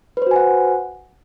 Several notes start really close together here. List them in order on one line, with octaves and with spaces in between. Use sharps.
B4 C5 F#4 G#5 F#5